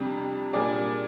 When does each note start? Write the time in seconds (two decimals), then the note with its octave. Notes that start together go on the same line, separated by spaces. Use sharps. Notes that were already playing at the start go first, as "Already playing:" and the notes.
Already playing: F2 C3 G3 D4
0.53 A#2 G3 D4 G#4 D5